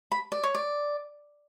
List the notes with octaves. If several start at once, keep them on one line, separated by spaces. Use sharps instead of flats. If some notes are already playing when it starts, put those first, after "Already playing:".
B5
D5
C#5
D5